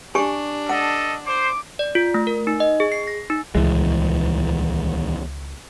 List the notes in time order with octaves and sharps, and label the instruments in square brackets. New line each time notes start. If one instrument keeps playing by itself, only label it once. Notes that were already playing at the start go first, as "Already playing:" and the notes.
[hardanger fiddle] D4 [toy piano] G4 G#5 C#6
[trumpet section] A4 D#5 [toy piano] F#5
[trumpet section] C5 [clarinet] D6
[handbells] D5
F4
A3
A#4
D#4
D#5
G#4
C7
A#6
D#4
[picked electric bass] D#1 E3 G#3 [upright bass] C#2